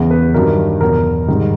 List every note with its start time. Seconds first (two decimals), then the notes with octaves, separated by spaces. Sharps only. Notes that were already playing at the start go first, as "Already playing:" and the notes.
Already playing: E2 C#3 E3
0.11 B4
0.34 G2 D#3 F#3 A#4
0.81 E2 B2 F#3 A#4
1.28 G#2 D#3 G3